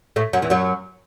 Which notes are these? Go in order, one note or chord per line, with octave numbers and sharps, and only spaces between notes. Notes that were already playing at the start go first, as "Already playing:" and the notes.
A2 A3
F#2 F#3
E2 E3
F#2 F#3